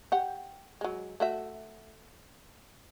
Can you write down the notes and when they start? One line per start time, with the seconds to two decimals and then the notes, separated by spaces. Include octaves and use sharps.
0.12 G4 F#5
0.81 F#3 G#3
1.20 A3 F#4 E5